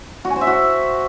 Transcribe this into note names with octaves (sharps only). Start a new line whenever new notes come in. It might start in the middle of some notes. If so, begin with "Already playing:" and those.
F#4
G#5
C5
E5
F#4